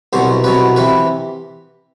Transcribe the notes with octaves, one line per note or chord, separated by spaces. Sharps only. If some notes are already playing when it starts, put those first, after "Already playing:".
C2 B2 F#3 C5
C2 B2 F#3 B4
C3 E3 B4